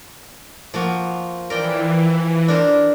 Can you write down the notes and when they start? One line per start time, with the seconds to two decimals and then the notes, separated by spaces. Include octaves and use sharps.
0.74 F3 A#3 F#4
1.50 E3 A#4 D5 G5
2.48 D4 A#4 C5